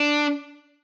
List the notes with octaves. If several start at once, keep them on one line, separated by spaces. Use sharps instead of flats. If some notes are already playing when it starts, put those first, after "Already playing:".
Already playing: D4